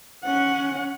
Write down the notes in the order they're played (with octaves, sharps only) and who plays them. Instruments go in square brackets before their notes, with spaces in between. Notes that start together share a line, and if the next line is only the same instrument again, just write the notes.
[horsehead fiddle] C#4 F#5